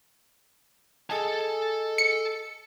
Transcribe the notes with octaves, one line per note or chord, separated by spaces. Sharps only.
G#4 A4 D#5 G#5 A5
C#7